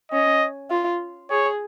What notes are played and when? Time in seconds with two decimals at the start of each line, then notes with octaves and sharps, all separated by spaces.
0.12 C#4 D#5
0.71 F4
1.30 G#4 C#5